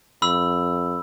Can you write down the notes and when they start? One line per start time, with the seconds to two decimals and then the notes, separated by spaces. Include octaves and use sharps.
0.22 F2 B5 E6